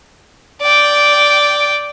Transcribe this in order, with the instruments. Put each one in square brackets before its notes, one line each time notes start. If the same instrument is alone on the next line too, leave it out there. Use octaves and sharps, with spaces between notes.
[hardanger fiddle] D5 G5